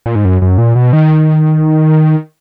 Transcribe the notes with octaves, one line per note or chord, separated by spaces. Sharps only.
A#2
G#2
F#2
F#2
A#2
B2
D#3